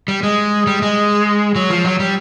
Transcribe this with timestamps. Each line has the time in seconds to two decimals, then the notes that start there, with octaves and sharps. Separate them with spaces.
0.08 G3
0.23 G#3
0.67 G3
0.82 G#3
1.55 F#3
1.70 F3
1.85 F#3
2.00 G3